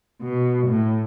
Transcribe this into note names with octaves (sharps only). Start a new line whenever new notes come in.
B2
A2